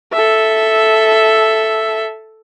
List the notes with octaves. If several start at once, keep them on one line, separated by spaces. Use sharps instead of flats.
A4 E5